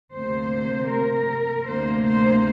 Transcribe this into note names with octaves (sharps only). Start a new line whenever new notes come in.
D2 C3 A#3 C5
A#4
D2 C3 A#3 C5
C5